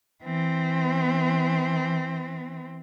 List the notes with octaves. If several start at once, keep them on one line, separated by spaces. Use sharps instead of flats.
E3 C4